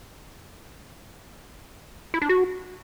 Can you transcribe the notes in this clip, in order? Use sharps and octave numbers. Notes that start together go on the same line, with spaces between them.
E4
D4
F#4